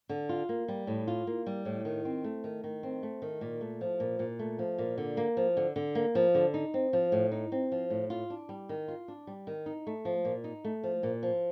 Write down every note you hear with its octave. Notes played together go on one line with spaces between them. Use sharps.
D3
F4
A#3
G3
A2
F4
A#3
G3
A2
D#3
C4
A3
D#3
D#3
C4
A3
D#3
A#2
A3
F3
A#2
A#2
A3
F3
A#2
D3
A#3
F3
D3
D3
A#3
F3
D3
D#4
C4
F3
A2
D#4
C4
F3
A2
F4
D4
G3
D#3
F4
D4
G3
D#3
D#4
A3
F3
A#2
D#4
A3
F3
A#2
F3